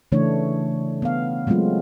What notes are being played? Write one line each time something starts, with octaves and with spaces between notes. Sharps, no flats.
C#3 E3 A3 D4 C#5
B3 F5
F#3 G#3 A3 C4 F4